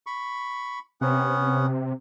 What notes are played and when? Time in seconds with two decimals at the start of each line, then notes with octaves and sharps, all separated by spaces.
0.06 B5 C#6
1.01 C3 B3 C#4 F#5